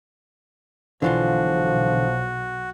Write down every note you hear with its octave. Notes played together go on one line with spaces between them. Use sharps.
B1 D3 E3 F3 F4 F#4